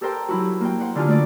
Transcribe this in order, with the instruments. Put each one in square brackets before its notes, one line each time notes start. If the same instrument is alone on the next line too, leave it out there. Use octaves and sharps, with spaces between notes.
[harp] G4 A4 A#4 C5 G5
F#3 E4 F#4
A#3 G5
C5 F#5
D3 D4 F4 G4 G#5 F6
A3 D#4 F#4 D5